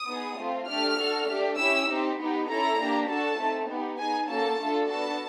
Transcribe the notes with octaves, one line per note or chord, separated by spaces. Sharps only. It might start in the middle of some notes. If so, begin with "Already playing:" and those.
Already playing: D#6
B3 D#4 G#4
A3 C4 F4
A3 D4 G4 F6
D4 F#4 A4
A3 D4 G4
C#4 E4 G4 E6
C4 D#4 G4
B3 D#4 G4
C#4 E4 A4 A#5
A#3 D4 G4
D4 F#4 A4 A5
A3 C4 D#4
B3 D#4 G4
B3 D#4 G#4 G#5
A#3 C#4 F#4 A4 A5
A3 D4 F4 A4
B3 D4 F#4 A4 A5